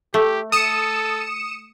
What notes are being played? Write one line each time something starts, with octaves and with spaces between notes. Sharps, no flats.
A3 G4
A4 D#6 C#7 E7